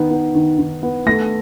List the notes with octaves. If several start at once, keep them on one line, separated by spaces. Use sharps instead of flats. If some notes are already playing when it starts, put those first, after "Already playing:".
Already playing: D#3 B3
B3
D#3
D#3
B3
A3 A#6